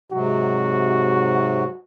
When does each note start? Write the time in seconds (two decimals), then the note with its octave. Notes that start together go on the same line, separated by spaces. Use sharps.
0.12 G#2 C3 F#3 F#4